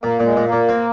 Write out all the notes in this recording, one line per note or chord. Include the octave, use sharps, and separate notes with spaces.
A#2 A#3
A#2
G#3
A#2
A#2 A#3
C4